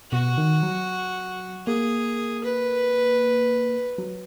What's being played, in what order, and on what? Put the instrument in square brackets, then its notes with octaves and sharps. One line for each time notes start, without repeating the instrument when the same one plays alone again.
[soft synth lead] B2 [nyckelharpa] F#4
[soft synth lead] D#3
F#3
[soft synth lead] A#3 [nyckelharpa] G#4
[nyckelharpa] B4
[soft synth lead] F#3